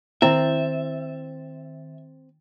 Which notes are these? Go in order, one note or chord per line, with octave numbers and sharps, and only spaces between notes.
D#3 C4 E4 E5 A6